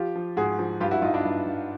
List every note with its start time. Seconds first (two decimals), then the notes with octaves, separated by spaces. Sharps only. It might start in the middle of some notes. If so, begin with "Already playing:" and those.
Already playing: F3 F4 G4
0.15 F3
0.37 G#2 F#4 G#4
0.59 F3
0.80 G2 F4 G4
0.91 E4 F#4
1.02 G2 D#4 F4
1.14 D4 E4
1.25 G2
1.46 G2